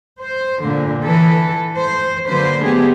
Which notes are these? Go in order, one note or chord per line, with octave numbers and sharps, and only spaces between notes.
C5
A#2 D3
E3 A4 B4
C5
D3 F#3 A#3 B4 C5
A3 B3 G4 G#4